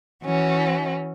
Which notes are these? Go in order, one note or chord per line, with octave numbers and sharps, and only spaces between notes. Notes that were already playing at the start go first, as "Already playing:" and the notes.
E3 C#4 F#4